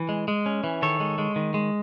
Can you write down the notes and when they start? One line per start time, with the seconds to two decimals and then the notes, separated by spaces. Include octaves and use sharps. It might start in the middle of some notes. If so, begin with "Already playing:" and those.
Already playing: E3
0.09 G#3
0.28 G#3
0.46 C#4
0.64 E3
0.82 D#3 A4 C#5
1.00 G#3
1.18 G#3
1.36 D#3
1.54 G#3